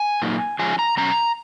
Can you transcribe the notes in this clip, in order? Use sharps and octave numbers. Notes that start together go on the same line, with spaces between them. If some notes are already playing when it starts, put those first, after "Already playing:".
Already playing: G#5
A#2 F#3 A#3 D#4
F3 G#3 C#4 G#5
A#5
B2 F#3 C#4 A#5